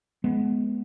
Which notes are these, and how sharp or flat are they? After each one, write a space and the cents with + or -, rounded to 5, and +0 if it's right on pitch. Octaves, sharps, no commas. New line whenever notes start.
G#3 +25 B3 +0